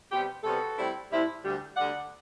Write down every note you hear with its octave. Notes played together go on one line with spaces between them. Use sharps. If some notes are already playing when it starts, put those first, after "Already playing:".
C3 G3 B3 G4
C3 G3 B3 F#4 A4
A2 G3 C4 E4
A2 G3 C4 E4
D2 D3 G3
D2 D3 G3 D5 F#5